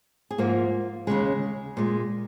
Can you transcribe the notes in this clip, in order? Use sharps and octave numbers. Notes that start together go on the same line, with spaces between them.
G#4
G#2 F3 A#3 F4
D#2 C#3 G#3 G#4
A#2 G#3